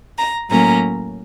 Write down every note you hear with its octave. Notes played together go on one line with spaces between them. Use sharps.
A#5
A2 F#3 A#3 C#4 A#5